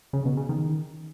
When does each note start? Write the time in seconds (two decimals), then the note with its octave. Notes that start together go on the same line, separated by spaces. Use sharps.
0.13 C#3
0.25 B2
0.37 C#3
0.49 D#3